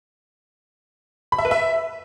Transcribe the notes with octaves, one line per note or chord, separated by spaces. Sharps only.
B5
E5
B4
E5